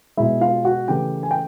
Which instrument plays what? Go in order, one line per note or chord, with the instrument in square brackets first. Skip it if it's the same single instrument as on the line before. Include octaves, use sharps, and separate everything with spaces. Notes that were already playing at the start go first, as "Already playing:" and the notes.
[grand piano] B2 G#3 E4 E5
F4 F5
F#4 F#5
C#3 E3 A3 G4 G5
G#5
G5